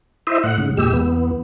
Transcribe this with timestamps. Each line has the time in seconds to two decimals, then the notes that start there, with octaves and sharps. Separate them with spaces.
0.27 E4 C5 D#5 E5
0.44 A2 F#5
0.58 G#2 C#3
0.77 E2 A#2 G#3 G4 E6
0.93 E2 B3